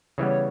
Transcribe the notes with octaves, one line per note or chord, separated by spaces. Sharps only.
C#3 E3 G3 B3 C#5